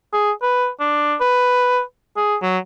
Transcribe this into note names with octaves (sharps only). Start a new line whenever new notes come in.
G#4
B4
D4
B4
G#4
F#3